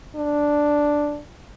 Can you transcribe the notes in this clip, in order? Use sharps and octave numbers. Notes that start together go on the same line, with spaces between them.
D4